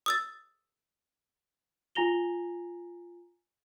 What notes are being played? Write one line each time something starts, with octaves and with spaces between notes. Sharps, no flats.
D#6 E6 A6
F4 G#5 A#5 A#6 F7 G7